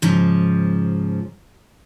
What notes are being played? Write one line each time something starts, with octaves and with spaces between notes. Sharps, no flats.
G#2 C#3 F3